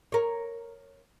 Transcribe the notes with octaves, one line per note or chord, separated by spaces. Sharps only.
A#4 C#5